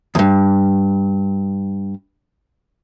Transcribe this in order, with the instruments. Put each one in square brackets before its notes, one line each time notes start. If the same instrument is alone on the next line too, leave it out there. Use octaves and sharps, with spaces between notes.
[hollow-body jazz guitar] E2 G2